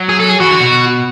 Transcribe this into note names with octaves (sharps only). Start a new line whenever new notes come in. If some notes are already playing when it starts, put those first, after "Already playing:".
Already playing: F#3
G#4
A4
G#4
E3 F#4
D3
B2